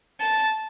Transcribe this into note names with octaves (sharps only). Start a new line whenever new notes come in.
A5